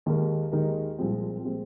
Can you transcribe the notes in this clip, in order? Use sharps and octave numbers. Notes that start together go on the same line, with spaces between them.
D#2 D#3 G#3 D#4 A#4
D#2 D#3 G#3 D#4 A#4
C2 A#2 F3 G#3 C4
A#2 F3 G#3 C4